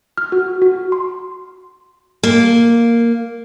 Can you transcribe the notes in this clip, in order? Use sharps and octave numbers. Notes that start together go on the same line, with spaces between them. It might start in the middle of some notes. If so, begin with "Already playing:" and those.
F6
F#4
F#4
C6
A#3